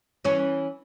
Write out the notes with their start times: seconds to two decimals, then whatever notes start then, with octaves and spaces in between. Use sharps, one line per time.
0.25 E3 C#4